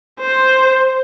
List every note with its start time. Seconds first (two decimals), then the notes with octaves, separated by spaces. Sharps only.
0.20 C5